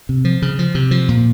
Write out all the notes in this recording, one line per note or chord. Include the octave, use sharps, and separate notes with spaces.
C3
F3
C#3
F3
C3
F3
A#2